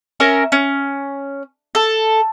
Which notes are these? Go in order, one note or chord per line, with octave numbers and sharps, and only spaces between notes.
C#4 A#4 E5
C#4
A4